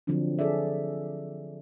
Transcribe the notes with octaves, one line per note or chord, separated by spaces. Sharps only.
D3 F3 F#3 C4 D4
G#4 A4 D5 E5